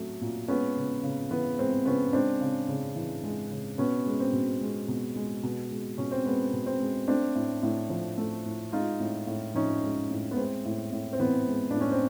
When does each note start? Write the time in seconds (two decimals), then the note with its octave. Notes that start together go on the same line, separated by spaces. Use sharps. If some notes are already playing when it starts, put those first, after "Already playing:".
Already playing: F#3 A3
0.21 A#2
0.48 G#3 B3 C#4
0.76 C#3
1.03 C#3
1.31 E3 B3
1.58 G#3 C4
1.85 C#3 B3 C#4
2.13 G#3 C4 D4
2.40 C#3
2.68 C#3
2.96 E3
3.23 G#3
3.51 C#3
3.78 B2 B3 C#4
4.06 G#3
4.20 C4
4.33 B2
4.61 G#3
4.88 B2
5.16 G#3
5.43 B2
5.71 G#3
5.98 B2 C#4
6.11 C4
6.26 G#3 B3
6.53 B2
6.66 C4
6.80 G#3
7.08 A3 C4 D4
7.35 A2
7.63 A2
7.90 F3
8.18 A3
8.46 A2
8.72 G#3 D#4 F4
9.00 A2
9.27 A2
9.54 F3 C#4 D#4
9.82 G#3
10.11 A2
10.31 B3
10.37 G#3 C4
10.65 A2
10.92 A2
11.13 C4
11.20 E3 B3
11.48 G#3
11.71 A2 D4
11.81 C#4
11.92 C4